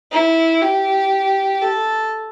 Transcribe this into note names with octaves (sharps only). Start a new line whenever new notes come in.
E4
G4
A4